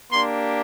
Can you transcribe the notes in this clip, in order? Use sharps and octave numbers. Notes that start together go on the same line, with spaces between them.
A#3 D4 G4 C6